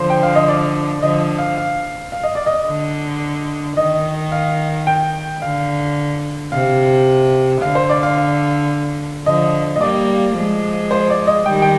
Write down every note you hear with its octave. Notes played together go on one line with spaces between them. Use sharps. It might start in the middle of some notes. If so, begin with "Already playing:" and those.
Already playing: D3 F3 C5
G5
F5
D#5
D5
D3 F3 D#5
F5
F5
F5
D#5
D5
D#5
D3
D#3 D#5
F5
G5
D3 F5
C3 F5
D3 F5
C5
D5
F5
F5
D3 F3 D#5
D#5
G3 A#3 D5
F3 G#3
C5
D5
D#5
D#3 G3 G5
G5